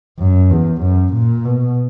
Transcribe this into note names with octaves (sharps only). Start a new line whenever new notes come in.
F#2
E2
F#2
A#2
B2